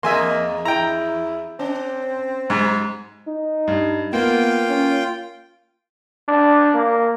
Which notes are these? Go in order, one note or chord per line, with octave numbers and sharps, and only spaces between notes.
E2 A#3 G#4 D#5 E5 G#5 C6
E4 G5 A#5
C4 C#4
G#2 F#3
D#4
G2
A#3 B3 F4 G5
C#4
D4
A#3